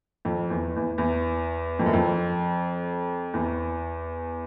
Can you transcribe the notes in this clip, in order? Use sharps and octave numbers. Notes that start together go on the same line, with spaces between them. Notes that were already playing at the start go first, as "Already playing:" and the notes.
F2
E2
E2
E2
F2
F#2
F2
E2